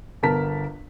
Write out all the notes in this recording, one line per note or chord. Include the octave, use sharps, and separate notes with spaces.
G1 B3 A#4 A5 B6